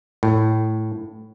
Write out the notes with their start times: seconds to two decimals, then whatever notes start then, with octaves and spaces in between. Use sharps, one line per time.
0.23 A2